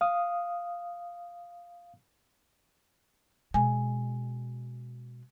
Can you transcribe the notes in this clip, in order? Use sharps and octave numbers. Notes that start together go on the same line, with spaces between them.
F5 D#6
B2 G#3 G#5